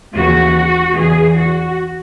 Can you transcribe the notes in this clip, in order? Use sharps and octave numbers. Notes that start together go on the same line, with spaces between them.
D#2 C#3 E3 F#4
E2 C#3 E3 G#4
F#4